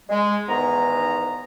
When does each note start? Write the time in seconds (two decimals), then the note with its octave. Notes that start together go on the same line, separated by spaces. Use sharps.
0.09 G#3
0.49 E2 G#2 D#3 B3 A#5